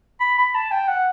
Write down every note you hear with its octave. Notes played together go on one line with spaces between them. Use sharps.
B5
B5
A5
G5
F#5